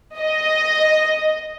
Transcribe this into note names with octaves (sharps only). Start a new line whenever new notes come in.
D#5